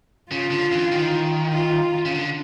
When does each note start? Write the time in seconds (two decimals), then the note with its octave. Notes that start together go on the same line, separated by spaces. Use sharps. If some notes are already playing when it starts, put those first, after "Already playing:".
0.31 C#3 F4
0.51 D3
0.73 E3
0.92 D#3
1.53 F4
2.05 C#3
2.14 D3